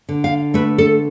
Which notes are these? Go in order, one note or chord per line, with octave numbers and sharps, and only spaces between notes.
D3
F5
A3 B4
A4